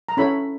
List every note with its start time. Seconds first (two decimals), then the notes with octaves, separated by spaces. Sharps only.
0.09 A#5
0.17 C#4 E4 A4 C#5 B5